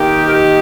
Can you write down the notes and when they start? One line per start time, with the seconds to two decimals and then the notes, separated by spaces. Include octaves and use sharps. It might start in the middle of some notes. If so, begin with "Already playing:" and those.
Already playing: D#3 A#3 D#4 G4
0.27 A#4
0.32 G4